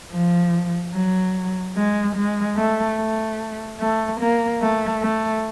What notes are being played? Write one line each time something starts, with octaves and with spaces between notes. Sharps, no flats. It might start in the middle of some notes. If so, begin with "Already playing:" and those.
F3
F#3
G#3
G#3
A3
A3
A3
A#3
A3
A3